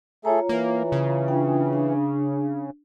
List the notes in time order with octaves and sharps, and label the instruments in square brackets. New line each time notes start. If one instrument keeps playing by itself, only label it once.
[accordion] A3 G#4 A4 [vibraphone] F4 C#5 A#5
[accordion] E3 [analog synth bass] A#3
[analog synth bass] C#3
[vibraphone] D4 F4 G5
D4